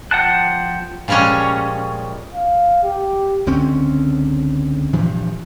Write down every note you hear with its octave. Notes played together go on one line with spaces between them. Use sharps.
F3 F#5 G5 A5 F#6
A#2 F3 G3 G#3 C#4
F5
G4
C#2 D3 C4 C#4
G2 A#2 E3 F3